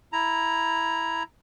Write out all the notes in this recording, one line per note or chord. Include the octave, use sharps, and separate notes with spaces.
E4 A#5